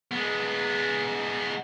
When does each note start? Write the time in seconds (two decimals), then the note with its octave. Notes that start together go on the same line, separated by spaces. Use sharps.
0.11 G#3 B3